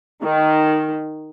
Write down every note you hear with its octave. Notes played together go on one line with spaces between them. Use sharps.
D#3